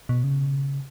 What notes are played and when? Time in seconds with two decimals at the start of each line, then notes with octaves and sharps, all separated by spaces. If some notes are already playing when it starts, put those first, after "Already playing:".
0.09 B2
0.24 C#3